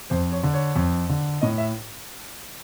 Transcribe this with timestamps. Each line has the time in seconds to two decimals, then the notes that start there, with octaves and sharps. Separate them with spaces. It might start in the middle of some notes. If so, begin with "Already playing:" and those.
0.10 F2 C5
0.32 C#5
0.43 D3
0.54 C#5
0.76 F2
1.09 D3
1.41 A2 D#5
1.58 E5